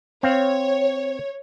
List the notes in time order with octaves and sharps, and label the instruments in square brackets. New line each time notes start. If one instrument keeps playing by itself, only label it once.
[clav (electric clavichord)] C4 F5 [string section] C#5